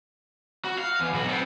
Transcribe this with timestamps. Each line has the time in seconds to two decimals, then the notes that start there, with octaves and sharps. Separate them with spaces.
0.65 F#4
0.78 F5
1.00 E2
1.14 B1 F#4
1.28 B3 C4